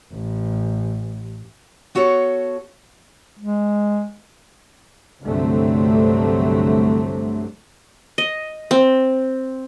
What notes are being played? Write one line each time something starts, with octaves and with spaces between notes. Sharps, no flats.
A1
B3 F#4 A4 C#5 D#5 F#5
G#3
C2 G2 D3 F#3 A3 C4
D#5
C4